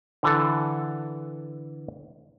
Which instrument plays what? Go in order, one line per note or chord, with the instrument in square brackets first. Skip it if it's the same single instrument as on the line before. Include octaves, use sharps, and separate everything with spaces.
[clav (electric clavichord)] D3 E3 A4